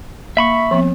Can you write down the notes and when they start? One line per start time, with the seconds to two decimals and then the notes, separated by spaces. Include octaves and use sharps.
0.37 A#3 E5 B5 C#6
0.71 F3 B3 C4